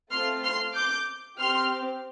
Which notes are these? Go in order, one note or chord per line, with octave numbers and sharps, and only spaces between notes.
A3 C4 F4 C6 F6
C6 F6
D6 G6
C4 G4 C6 F6